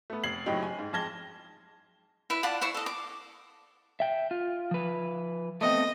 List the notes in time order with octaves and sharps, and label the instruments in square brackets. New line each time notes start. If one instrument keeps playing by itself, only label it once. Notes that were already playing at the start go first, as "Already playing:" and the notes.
[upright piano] A3 B3
F1 G#6 C7 F#7
F#1 A2 F#3 D#4 G4 G5
G#5
G#2
F2 G#3 A5 G#6 A#6 G7
[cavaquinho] E4 B4
F4 D5 F#5 A5
E4 C5 C#6
A4 D#5
D6
[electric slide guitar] E5 G5
F4
F3 B4
[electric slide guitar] A3 B3 C4 [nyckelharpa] D#5